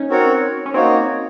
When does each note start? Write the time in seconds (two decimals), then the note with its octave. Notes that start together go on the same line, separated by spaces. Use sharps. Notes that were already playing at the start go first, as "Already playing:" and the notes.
Already playing: C#4 D#4
0.10 C4 F#4 A#4 C#5 F#5
0.66 C#4
0.74 A#3 C4 D#4 F#4 C#5